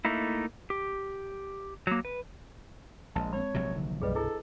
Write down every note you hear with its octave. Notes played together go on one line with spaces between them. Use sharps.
A3 A#3 D#4 E4
G4
F#3 A#3
B4
A#1 G#3 A5
G#3 C4 C#5 B5
A#1 C3 F#3
D3 D#3
C2 G2 B2 G3 G#4 B4 D#5
D4 E4 G#4 A4